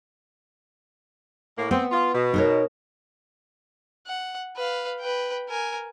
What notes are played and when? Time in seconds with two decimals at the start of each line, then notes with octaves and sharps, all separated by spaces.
1.58 A2 A#3
1.71 B3 C4
1.92 F4
2.13 B2
2.34 D#4 A#4 C#5
4.07 F#5
4.56 B4 F5
5.00 B4 G5
5.48 A#4 G#5